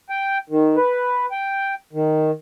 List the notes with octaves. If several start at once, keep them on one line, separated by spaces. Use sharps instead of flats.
G5
D#3
B4
G5
D#3